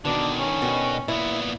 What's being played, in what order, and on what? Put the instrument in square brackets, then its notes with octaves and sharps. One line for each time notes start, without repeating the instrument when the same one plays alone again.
[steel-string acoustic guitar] B2 [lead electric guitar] D3 D#3 [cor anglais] D4
[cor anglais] C#4
[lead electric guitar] B2 [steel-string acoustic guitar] D3 D#3 F#4
[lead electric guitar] A#2 B3 [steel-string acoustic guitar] E4